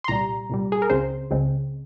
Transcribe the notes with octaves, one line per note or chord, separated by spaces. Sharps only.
C6
C2 A#2 G3 A#5
C2 A#2 G3
G#4
A#4
C#2 C#3 G#3 C4 C5
C#2 C#3 G#3 C4